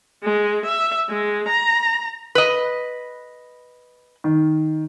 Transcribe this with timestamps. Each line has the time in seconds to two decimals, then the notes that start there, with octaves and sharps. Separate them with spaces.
0.23 G#3
0.66 E5
1.09 G#3
1.49 A#5
2.35 B4 D#5
4.24 D#3